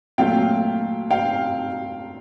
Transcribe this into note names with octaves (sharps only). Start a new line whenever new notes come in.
A#2 F#3 A3 F5 G5
F5 G5